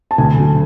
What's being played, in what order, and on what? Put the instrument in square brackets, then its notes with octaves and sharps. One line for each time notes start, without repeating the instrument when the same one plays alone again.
[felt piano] A5
D2 G#5
D3 F#3